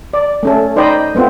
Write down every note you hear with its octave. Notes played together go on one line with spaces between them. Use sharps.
D5
A3 C#4 A4
D#4 C5 D5 D#5 G5 B5
A3 B3 C4 F4